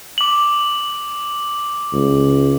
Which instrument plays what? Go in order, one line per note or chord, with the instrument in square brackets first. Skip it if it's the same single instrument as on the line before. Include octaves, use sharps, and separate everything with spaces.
[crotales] D6 F#7
[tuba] C#2